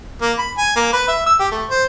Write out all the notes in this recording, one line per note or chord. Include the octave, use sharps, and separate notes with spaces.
A#3
B5
G#5
A#3
B4
E5
E6
G4
A3
C5